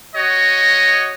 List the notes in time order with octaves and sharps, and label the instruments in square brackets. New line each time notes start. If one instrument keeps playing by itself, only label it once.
[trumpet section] F#4 C#5 D#5